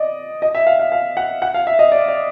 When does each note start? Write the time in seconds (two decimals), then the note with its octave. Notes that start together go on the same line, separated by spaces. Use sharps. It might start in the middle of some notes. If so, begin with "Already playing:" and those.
Already playing: D5 D#5
0.42 D#5
0.55 E5
0.67 F5
0.79 F5
0.92 F5
1.17 F#5
1.42 F#5
1.54 F5
1.67 E5
1.79 D#5
1.92 D5
2.08 D5